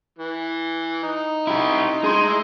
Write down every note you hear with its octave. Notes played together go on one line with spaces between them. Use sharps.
E3
D#4
E4 G4
G#4 C6
E4 A#5